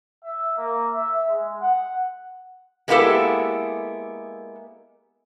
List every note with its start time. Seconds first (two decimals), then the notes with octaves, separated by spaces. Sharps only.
0.23 E5
0.58 A#3
0.94 E5
1.29 G#3
1.61 F#5
2.88 G#3 A#3 B3 E4 G4 A4